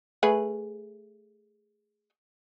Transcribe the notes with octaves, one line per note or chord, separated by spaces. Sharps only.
A3 G#4 B4